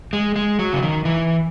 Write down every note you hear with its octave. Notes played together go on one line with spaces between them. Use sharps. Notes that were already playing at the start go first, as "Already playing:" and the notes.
G#3
G#3
F#3
C#3
D#3
E3